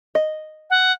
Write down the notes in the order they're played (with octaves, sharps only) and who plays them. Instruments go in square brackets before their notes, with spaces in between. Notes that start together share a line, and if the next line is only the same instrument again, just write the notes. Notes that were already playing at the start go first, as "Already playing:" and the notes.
[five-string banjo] D#5
[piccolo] F#5